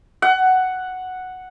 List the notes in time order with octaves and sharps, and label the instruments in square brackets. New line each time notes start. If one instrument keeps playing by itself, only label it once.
[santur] F#5